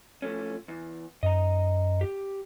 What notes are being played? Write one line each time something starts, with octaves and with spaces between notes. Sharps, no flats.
F3 A3 C#4
E2
F#2 D#5 A#5
G4